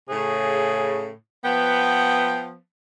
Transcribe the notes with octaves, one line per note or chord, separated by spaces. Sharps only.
A2 C#3 G#4
F3 B3 G5